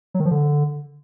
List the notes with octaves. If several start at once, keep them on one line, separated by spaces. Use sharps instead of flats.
F#3
D#3
F3
D3